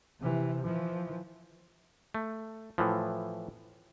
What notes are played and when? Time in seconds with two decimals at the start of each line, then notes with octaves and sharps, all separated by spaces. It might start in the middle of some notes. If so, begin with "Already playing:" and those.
0.20 C3 E3
0.63 E3 F3
2.14 A3
2.78 A2 E3 F3